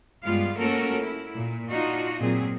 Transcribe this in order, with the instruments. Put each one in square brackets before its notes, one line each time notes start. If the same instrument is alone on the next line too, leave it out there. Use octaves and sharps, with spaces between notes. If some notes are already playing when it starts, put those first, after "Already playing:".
[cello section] G2 G3 G#3 B3 F4 F5
A3 A#3 C#4 F#4 A4 A#4
E4
A#2
D4 D#4 F4 F#4 D#5
A#2 F#3 C4 G#4